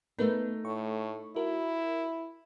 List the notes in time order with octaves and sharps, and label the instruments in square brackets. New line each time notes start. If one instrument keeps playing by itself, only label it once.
[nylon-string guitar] A3 D#4 [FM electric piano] B3 A#4 B4
[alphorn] A2 [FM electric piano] C#6
[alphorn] E4 [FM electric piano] F#4 A#4